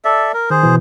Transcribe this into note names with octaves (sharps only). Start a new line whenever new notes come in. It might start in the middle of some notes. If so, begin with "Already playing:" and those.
A4 D5 E5
A#4
D#3 G#4 C5
B2 E3